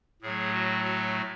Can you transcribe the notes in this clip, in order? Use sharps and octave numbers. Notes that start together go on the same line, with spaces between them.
A2 F#3 A3 G#4
F#4
F#4